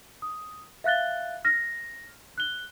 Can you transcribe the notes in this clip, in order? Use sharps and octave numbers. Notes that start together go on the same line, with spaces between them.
D#6
E5 F5 F#6 A6 G7
F6 A#6
F#6 G7